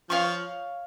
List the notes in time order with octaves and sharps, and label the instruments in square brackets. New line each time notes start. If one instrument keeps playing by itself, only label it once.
[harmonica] F3 [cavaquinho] C#5 F5 C#6